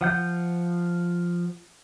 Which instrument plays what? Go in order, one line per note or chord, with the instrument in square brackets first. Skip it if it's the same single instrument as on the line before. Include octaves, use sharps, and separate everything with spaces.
[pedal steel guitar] F3 F#5 G6